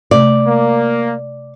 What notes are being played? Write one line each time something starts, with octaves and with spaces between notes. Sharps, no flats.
C3 A3 D5
A#3